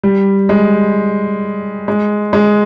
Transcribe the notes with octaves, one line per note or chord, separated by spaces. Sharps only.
G3
G#3
G#3
G#3